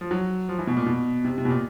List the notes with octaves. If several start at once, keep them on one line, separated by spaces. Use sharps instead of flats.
F3
F#3
F3
E3
B2
A#2
B2
C3
C3
B2
A#2